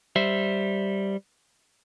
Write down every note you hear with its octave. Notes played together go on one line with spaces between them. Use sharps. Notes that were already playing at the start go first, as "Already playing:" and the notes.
G3 C5 E5